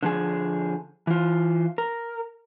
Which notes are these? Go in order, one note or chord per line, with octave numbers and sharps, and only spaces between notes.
D3 F3 G#4
E3 F4
A#4